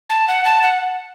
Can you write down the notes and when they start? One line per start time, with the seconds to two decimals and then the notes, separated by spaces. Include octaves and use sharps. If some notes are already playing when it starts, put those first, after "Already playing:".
0.10 A5
0.28 F#5
0.45 A5
0.63 F#5